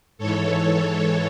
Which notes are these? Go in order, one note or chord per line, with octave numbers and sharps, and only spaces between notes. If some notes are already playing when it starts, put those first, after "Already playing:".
G#2 E3 A4 C#5